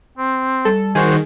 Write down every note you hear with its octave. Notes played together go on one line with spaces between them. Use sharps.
C4
G3 A4
D#3 F#4 G#4 C5